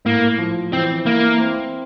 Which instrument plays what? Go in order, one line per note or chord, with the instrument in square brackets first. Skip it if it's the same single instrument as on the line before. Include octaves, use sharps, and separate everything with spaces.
[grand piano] A2 [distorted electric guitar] A#3
[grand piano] F3
[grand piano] E3 [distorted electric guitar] C4
[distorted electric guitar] A#3 [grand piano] E4
[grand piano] C4